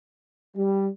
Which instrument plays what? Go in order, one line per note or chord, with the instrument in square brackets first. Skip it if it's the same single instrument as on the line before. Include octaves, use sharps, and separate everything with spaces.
[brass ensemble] G3